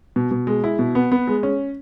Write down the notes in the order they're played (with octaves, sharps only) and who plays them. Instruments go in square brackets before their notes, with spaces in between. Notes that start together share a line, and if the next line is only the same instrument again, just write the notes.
[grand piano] B2
B2
G#3
E4
B2
B3
B3
G#3
C#4